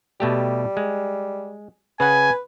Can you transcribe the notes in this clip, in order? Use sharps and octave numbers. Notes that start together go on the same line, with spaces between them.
B2 G3 A3 G4
G#3
C#3 B4 F#5 G#5